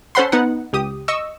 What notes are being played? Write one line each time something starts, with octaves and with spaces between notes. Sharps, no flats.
C#4 A4 C5 F#5 B5 C6
B3 D#4 F#5
C#2 G4 D#6
D#5 C#6 E6